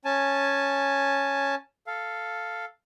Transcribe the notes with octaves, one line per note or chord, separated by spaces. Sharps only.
C#4 G#5 A5
A4 F5